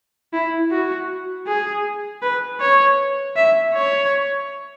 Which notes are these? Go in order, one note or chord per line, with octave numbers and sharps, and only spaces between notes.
E4
F#4
G#4
B4
C#5
E5
C#5